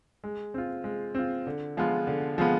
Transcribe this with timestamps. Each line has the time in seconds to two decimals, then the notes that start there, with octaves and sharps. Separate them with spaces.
0.24 G#3
0.54 C4 F4
0.84 G#3
1.15 C4 F4
1.46 D3
1.77 F3 G#3 B3 F4
2.07 D3
2.38 F3 G#3 B3 F4